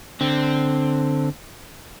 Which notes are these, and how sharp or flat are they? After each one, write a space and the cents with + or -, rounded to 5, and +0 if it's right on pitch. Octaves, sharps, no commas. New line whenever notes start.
D3 +5 C4 +0